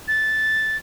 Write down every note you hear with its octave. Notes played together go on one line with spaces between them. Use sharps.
A6